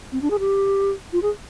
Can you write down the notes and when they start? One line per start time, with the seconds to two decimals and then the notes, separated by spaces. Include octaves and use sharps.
0.12 C4
0.22 D4
0.30 G#4
0.39 G4
1.13 F4
1.22 G#4